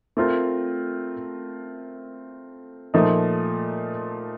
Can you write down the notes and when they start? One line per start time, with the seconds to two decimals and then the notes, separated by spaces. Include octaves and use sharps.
0.17 A3 C4 F4 A#4
2.94 A#2 F3 A3 D#4